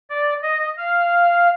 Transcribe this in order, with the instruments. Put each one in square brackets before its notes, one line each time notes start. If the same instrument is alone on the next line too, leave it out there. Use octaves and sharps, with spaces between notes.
[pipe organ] D5
D#5
F5